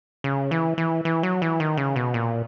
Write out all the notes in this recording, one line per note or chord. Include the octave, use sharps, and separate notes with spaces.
C#3
E3
E3
E3
F#3
E3
D#3
C#3
B2
A#2